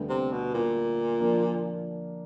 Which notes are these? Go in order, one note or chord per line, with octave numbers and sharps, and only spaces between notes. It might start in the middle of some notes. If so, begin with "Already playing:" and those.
Already playing: D2 D3 G3 B3
C3
B2
A#2
F3 A#3 D4